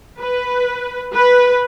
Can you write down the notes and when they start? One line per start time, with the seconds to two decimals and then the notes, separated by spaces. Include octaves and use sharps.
0.20 B4
1.14 B4